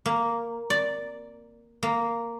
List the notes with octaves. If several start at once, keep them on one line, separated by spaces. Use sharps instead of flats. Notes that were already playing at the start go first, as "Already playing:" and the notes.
A#3
D5
A#3